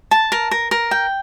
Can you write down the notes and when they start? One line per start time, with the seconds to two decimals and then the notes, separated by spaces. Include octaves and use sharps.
0.11 A5
0.32 A#4
0.51 A#4
0.71 A#4
0.91 G5